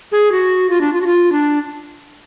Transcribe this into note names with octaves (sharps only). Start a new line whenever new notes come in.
G#4
F#4
F4
D4
F4
F#4
F4
D4